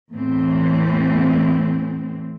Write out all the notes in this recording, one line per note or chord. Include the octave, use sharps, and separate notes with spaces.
E2 A2 E3 C4